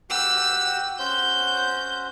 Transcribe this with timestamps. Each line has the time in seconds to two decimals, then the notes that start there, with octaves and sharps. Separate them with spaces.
0.10 F#4 G4 E6
0.99 C#4 F#4 C5 G6